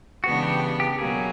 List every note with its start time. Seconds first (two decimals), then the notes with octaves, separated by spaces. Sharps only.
0.23 C#3 E3 G#3 B3 D4 F#4
0.43 G4
0.80 G4
0.98 B2 F#3 A#3 G#4